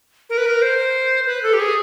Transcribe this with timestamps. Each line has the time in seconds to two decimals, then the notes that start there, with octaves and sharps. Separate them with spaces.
0.30 A#4
0.38 B4
0.46 A#4
0.62 C5
1.26 B4
1.43 A4
1.53 G4
1.60 G#4